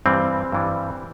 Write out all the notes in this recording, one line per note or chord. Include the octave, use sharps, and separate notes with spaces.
G2 E3 G3 C4
G2 E3 G3